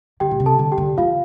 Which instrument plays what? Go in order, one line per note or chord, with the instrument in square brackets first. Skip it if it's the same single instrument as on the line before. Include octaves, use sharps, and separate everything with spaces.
[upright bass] D3 [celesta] G4 G5
[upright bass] A#2
C3
[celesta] A4 A5
[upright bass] D3
[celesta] G4 G5
[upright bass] D3
[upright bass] E3 [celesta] F4 F5